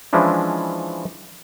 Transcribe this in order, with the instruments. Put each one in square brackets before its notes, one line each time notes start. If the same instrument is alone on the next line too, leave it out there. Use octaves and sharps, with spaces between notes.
[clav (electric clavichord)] E3 F3 G#3 C#4 D4 E4